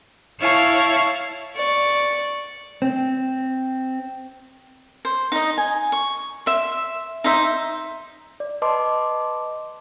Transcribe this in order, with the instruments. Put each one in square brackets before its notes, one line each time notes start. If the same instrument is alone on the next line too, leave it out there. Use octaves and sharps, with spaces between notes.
[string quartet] E4 C#5 F5 A5 C#6
[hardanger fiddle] D5 C#6
[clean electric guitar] C4
[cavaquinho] C5
D#4 D#5
G#5
C#6
E5 C6
D#4 C5 E5
[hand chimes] D5
B4 D#5 A5 C6 D6